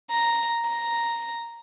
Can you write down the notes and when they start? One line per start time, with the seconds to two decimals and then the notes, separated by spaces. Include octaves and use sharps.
0.10 A#5
0.66 A#5